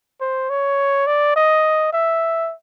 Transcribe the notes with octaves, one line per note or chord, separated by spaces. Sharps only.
C5
C#5
D5
D#5
E5